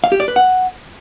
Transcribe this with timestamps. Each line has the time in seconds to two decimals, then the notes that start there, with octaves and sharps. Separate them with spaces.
0.04 F5
0.12 G4
0.20 D5
0.28 B4
0.36 F#5